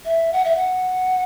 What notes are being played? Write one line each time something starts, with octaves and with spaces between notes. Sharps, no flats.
E5
F#5
E5
F#5